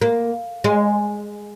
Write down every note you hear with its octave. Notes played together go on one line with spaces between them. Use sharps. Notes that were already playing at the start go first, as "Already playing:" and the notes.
A#3
G#3